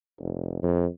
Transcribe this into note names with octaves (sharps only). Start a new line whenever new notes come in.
F1
F2